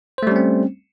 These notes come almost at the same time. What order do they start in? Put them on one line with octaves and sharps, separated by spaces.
C5 A3 G3 C#4 C4